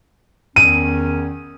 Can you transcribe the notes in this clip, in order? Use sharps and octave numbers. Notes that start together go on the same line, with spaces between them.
E2 D#3 C#4 D#7